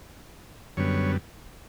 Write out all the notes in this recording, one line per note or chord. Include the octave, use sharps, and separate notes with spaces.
F#2 D3 G3 B3 C#5